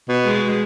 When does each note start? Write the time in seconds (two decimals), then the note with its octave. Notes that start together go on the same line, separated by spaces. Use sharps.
0.08 B2
0.24 G#3